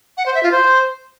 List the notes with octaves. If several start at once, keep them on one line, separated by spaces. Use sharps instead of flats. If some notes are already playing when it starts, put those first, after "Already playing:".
F#5
C5
E5
F4
C5